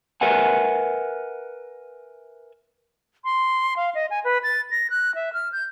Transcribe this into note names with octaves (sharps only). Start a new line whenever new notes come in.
A#4 B4 E5 F#5 G#5
C6
F5
D#5
G#5
B4
A6
A#6
F#6
E5
F6
G6